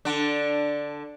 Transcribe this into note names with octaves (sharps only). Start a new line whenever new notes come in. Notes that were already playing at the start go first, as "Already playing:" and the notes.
D3 D4